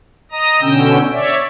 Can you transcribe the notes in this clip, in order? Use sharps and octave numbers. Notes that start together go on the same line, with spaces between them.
D#5 A#5 D#6 A#6
B2 D3 C#4 G5 E6 G6
C#5 D5 E5